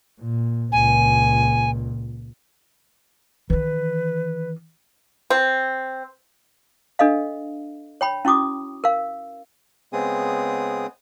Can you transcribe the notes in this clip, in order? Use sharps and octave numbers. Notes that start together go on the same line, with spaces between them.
A#2
C#2 A#2 G#5
D#3 E3 B4
C4
D4 A4 D#5 F5
C#5 G5 B5
C#4 E4 F#4 D6 D#6
A#4 F5
C#3 G#3 B3 C4 G#4 D#6